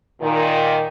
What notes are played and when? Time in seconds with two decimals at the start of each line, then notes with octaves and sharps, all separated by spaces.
0.22 A#2 D#3